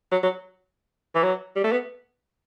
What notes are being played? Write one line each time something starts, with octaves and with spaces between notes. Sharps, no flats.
F#3
F#3
E3
F#3
G3
A3
B3